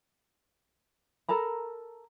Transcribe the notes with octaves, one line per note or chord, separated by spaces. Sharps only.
A4 A#4 A#5 B5